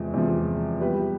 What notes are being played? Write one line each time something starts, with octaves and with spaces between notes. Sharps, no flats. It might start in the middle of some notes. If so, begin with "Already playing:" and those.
Already playing: E2 C3 F3 G#3
E2 C3 F3 G#3
G3 B3 E4 G4 B4